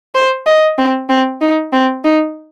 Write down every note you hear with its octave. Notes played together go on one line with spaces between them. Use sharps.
C5
D#5
C4
C4
D#4
C4
D#4